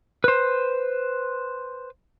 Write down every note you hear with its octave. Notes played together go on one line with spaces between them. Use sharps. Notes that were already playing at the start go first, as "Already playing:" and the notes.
B4 C5